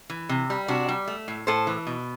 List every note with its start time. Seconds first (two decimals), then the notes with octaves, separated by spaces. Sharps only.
0.10 E3
0.29 C3
0.50 G3
0.68 C3 D4 F#4
0.89 G3
1.08 A3
1.28 A2
1.47 A2 A4 C5
1.67 E3
1.87 B2